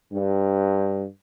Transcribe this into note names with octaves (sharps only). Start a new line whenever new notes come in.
G2